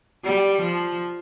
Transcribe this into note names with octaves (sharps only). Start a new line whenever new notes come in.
G3
F3